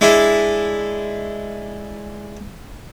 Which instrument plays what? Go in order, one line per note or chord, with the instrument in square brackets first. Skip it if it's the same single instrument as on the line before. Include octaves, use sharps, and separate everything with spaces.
[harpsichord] G#3 D4 E4